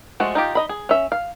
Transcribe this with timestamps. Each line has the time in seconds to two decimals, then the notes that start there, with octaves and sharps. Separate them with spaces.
0.20 F3 G#3 A3 F#4
0.35 D#4 F4 G4
0.55 D#4 D#5 B5
0.69 G#4
0.89 C#4 E5
1.12 F5